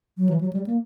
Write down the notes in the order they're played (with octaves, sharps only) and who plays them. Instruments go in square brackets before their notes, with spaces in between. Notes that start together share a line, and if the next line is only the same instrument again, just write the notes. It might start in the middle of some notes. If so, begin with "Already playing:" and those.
[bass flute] F#3
E3
F#3
G3
A#3